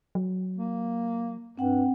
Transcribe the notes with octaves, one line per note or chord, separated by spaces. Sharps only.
F#3
A#3
G2 C4 F#5 G5